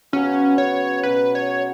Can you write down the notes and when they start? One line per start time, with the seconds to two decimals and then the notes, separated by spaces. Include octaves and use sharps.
0.13 C#3 F#3 B3 C#4 F#4
0.58 C#5
1.03 B2 F#3 C#4 F#4 B4
1.35 C#5